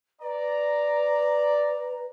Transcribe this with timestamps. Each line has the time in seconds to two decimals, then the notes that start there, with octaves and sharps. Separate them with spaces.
0.22 B4 D5 A#5